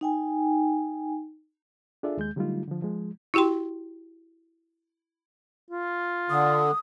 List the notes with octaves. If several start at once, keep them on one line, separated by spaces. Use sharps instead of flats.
D#4 G5 G#5
D4 F4 G#4 A4 D5 E5
D#2 G#3 G6
D3 F#3 G3 A3 D#4 F4
D3 F3
F3 G#3
E4 F#4 G4 G5 C6
F4
D3 D#6